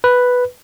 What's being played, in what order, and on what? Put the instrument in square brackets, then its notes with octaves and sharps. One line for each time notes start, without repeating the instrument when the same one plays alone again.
[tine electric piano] B4